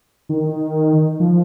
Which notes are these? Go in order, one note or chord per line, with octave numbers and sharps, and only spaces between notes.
D#3
F3